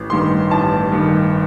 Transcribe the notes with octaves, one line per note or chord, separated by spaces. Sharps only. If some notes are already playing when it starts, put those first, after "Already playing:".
Already playing: A1
G2 D#3 C6
A1 A5
G2 D#3